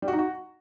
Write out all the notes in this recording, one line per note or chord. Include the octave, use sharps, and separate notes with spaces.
G3
F#4
D#4
F#4